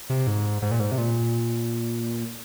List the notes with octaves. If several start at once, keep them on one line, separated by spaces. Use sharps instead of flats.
C3
G#2
G#2
A#2
G#2
C3
A#2